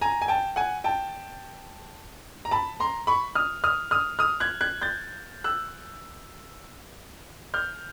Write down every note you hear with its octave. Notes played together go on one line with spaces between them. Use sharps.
G#5 A#5
G#5
G5 A5
F#5 G#5
G5 A5
A#5
A5 B5
A#5 C6
B5 C#6
D#6 F6
D#6 F6
D#6 F6
D#6 F6
F#6 G#6
F#6 G#6
G6 A6
E6 F#6
F6 G6